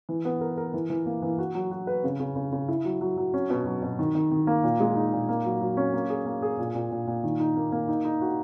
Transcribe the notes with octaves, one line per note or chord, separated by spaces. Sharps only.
E3
B3
A#4
A#4
E3
E3
A#3
E3
F#4
F#3
F#4
B4
C#3
C#3
C#3
C#3
E4
F#3
F#3
F#3
C#4
B2
F#3
B2
D#3
D#3
D#3
A#3
A#2
G#3
D#4
A#2
A#3
F#3
F#3
C#4
A#3
G#4
A#3
G#4
A#2
A#2
A#2
A#2
D#3
D#4
A#3
A#3
D#4
D#4
F#4